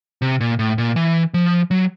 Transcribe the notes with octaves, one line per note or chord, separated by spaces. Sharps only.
C3
A#2
A2
A#2
E3
F3
F#3